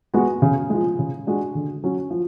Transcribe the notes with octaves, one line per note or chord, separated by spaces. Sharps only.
G#3 B3 F#4
C#3
F3 G#3
C#3
G#3 D4 F#4
D3
F#3 C#4 F#4
F3